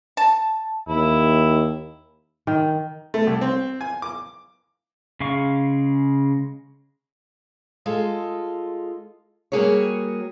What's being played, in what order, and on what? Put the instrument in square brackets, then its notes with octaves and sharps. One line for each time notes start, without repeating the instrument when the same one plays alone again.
[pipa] A5
[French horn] D#2 [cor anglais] E4
[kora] D#3
[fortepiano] A3
C2
C4
G#5
D6
[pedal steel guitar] C#3 G#3 F5 C#6
[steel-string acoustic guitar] G#3 F4 A4
G3 A#3 F#4 G#4 A#4 C#5